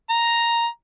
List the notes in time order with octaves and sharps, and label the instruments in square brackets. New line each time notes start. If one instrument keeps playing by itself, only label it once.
[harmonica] A#5